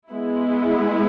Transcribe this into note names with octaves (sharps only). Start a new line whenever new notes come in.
G#3 B3 E4